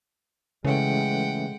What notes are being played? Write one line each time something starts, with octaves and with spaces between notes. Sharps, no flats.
C#3 E3 G#3 A3 C#4 F#5 G5